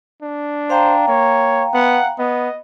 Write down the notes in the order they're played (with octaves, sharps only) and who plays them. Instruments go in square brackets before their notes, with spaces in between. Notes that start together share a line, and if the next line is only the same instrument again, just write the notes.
[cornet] D4
[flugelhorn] C5 [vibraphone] F5 G5 A#5
[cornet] A#3 [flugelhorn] C#5
[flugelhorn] B3 [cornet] F#5
[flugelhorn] B3 [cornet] D#5